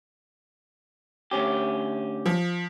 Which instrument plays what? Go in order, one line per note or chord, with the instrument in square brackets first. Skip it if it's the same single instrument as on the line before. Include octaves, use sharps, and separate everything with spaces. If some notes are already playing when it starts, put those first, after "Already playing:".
[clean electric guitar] D2 C#4 G4
[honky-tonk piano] F3